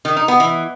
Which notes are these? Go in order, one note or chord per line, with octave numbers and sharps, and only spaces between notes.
D#3
D#4
B3
E3